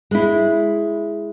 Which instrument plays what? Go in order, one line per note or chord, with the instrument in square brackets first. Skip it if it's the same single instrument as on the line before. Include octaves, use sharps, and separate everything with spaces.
[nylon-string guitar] G#3 E4